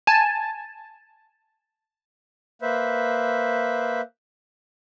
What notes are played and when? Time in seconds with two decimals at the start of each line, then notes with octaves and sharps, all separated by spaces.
0.07 G#5 A5
2.62 A#3 B4 C5 E5